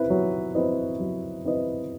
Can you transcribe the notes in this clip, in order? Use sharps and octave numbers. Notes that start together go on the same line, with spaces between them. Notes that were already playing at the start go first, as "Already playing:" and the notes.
Already playing: C4 E4 B4
F#3
C4 E4 B4 D#5
F#3
C4 E4 B4 D#5